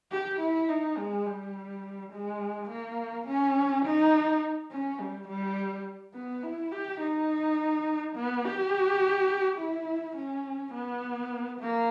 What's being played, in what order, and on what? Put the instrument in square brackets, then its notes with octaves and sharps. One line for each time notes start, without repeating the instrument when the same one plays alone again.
[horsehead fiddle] G4
E4
D#4
G#3
G3
G#3
A#3
C#4
D#4
C#4
G3
G3
B3
E4
G4
D#4
B3
G4
E4
C#4
B3
A#3